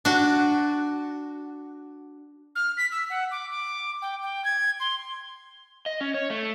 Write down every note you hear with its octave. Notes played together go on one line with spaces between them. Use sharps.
D4 F#4
F6
B6
E6
F#5
D6
D6
G5
G5
G#6
C6
D#5
C#4
C#5
A3